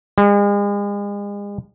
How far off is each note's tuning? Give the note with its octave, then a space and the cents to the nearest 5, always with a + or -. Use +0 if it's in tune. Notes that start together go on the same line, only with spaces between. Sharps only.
G#3 -40